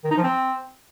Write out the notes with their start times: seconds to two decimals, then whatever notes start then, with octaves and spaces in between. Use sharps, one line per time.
0.04 D#3
0.11 D#4
0.17 F3
0.23 C4